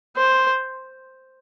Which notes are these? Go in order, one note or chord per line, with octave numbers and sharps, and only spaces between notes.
C5